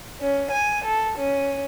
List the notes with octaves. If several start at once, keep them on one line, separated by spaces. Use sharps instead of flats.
C#4
G#5
A4
C#4